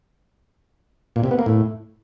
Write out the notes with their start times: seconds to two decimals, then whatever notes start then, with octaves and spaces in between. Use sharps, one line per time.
1.16 A#2
1.24 C3
1.31 B3
1.39 A#3
1.46 A2